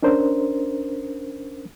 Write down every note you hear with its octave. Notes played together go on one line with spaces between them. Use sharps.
C#4 D4 A#4 C5